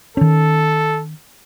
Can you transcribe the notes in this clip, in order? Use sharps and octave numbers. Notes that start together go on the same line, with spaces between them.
D#3 C#4 A4